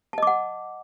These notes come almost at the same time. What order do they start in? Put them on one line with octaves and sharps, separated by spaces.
A5 D#5 D6 F#5